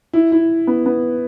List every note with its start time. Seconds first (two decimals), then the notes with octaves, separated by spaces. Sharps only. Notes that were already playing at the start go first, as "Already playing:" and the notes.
0.13 E4
0.32 E4
0.67 B3
0.86 B3